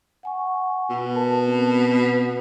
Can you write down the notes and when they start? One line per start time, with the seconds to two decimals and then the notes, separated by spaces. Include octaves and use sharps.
0.23 F#5 G#5 C#6
0.90 B2
1.15 A#4 A5
1.47 B3 C4